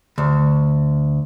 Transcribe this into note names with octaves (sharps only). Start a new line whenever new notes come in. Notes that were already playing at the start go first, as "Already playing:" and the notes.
D2